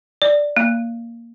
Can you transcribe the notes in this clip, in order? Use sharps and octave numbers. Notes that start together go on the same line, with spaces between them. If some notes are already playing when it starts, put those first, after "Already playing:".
D5
A#3